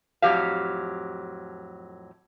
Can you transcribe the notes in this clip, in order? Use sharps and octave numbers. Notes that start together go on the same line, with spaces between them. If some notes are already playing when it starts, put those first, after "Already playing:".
F2 A2 F#3 G4 F5